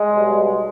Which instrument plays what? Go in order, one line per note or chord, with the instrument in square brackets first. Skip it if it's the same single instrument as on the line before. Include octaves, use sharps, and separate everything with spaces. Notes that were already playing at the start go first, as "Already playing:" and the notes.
Already playing: [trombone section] G#3
B1 B2 G3